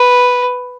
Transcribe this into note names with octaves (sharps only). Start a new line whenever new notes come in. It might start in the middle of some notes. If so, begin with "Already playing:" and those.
Already playing: B4